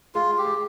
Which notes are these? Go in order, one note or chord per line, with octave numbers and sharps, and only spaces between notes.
G#3 F4
G4
G#3